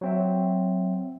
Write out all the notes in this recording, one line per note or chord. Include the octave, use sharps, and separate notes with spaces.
F#3 C4 E5